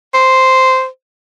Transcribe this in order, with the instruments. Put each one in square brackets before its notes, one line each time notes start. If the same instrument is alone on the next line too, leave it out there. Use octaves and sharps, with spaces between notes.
[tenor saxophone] C5